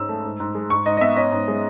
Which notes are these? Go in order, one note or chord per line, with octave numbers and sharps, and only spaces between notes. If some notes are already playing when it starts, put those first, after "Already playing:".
Already playing: G#2 G#3 C#4 E6
A3
G#2
G#2
G#3
G#2 C#6
G#2 D#5
D#5
B3 E5
C#4 D#5
G#2
G#3